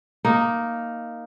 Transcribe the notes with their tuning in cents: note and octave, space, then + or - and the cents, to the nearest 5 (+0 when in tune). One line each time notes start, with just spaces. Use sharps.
A#3 +0 D#4 +0